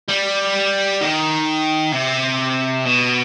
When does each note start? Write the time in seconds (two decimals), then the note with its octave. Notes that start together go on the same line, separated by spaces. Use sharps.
0.09 G3
1.01 D#3
1.92 C3
2.85 B2